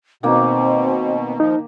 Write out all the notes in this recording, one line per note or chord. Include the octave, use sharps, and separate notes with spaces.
B2 D#3 A#3 C4
F3 D#4